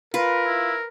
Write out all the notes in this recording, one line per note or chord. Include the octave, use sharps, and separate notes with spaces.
F4 A#4 B4
E4